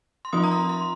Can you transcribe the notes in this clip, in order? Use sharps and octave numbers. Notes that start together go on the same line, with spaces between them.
C6
F3 C4 F4 D#6
A#5
C6
C6